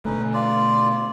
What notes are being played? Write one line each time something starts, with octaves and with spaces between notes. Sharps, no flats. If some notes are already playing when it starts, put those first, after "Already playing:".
B2 D3 A3 C#4 D#4 B4
F4 D5